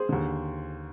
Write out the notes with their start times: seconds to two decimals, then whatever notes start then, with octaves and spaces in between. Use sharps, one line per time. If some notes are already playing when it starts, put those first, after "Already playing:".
Already playing: G#4 C5
0.09 D#2 D3